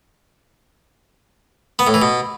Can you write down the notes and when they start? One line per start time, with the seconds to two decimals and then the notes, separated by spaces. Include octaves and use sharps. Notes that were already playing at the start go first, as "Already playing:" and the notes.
1.79 B3
1.87 A2
1.94 E3
2.02 B2